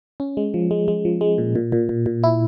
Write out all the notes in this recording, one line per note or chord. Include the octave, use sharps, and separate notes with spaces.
C#4
G#3
F3
G#3
G#3
F3
G#3
A#2
A#2
A#2
A#2
A#2
E4